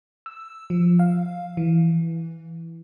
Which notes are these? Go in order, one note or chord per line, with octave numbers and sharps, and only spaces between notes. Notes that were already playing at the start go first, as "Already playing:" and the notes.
E6
F3
F5
E3